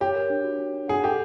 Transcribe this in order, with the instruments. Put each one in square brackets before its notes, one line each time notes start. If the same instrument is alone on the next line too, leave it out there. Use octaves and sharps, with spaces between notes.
[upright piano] G4 [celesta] C#5
[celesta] A#4
D4
F#4
D4
D4
[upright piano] G#4 [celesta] F#5
[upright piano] G4 [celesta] A4